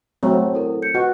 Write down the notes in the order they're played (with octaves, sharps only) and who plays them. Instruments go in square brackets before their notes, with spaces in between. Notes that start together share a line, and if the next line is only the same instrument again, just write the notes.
[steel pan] F#3 A3 C4 [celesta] C#5
[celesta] E4 A4 A#4
G6 C#7
[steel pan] F#4 [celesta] B4 D#5 F#5